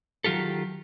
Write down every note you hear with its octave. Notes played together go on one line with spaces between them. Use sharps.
D#3 F#3 F4 G4 A4